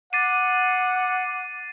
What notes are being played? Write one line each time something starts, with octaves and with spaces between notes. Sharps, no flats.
F#5 D6 A6 C7 D#7